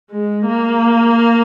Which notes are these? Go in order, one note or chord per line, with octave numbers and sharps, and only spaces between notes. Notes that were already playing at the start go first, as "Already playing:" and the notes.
G#3
A#3